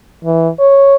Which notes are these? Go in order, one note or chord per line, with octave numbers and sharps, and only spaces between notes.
E3
C#5